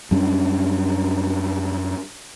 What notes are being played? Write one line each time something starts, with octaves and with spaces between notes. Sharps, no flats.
F#2 G3 C#4 D4